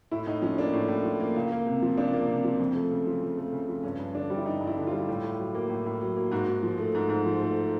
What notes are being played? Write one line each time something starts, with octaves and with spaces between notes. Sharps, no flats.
A2 E4
A2 D#4
F3 C#4
A#3 D4
A2
A2
F3
A#3
C#2
A#3
C3
F3
C#2 D4
A#3
C3
F3
F2
A3
C#3
F3
F2
A3
C#3
F3
G2 C#4
G2
D3 D4
G3
E4
G2 D#4
G2
E4
D3
G3 F4
A2
A2
F#3
A#3
A2
A2
F#3
A#3
G#2 F#4
G#2
F3
A3
G#2
G#2
F3
A3